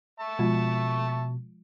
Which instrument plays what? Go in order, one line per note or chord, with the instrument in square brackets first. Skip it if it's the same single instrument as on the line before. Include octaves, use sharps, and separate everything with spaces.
[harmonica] E5 A5 C#6
[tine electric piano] B2 [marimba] F3 G#3 F4